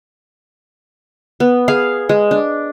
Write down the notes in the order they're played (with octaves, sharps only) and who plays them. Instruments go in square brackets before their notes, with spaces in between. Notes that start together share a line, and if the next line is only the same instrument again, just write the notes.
[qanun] B3
G#4 F5
G#3
D4